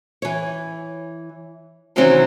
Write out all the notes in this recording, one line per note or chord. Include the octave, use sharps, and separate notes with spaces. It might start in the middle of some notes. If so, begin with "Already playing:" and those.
E3 C#5
C3 D#3 E3 F#3 C4 C#4